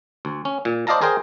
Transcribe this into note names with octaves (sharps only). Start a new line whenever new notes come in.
D2
C#4
A#2
C5 D5 D#5 F5 A5 A#5
G#4 A#4 C5 G5 G#5